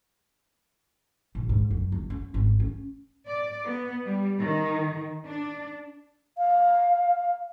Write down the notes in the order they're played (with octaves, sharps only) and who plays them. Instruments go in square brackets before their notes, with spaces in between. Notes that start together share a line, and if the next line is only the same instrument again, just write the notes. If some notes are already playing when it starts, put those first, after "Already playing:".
[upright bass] A#1
G#2
F#2
F#1
C#4
G#1
C#4
[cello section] D5
B3
G3
D#3
D4
[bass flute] F5